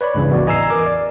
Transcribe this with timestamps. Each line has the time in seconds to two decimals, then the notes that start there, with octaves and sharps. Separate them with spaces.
0.01 B4 C#5 D5 B5
0.15 C#2 G2 C#3 E3
0.29 A1 E2 F#4 D5
0.46 E3 D#5 G#5 A#5 E6 C7
0.70 A#4 D6
0.86 D5